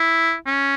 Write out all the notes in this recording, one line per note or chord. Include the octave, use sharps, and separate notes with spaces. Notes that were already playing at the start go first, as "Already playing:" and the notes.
Already playing: E4
C#4